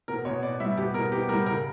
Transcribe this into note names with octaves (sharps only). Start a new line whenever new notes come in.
B2 A#4
B2 C#5
B3 D5
G3 E5
B2 G4
B2 A#4
B3 G4
G3 A#4
C#3 A#4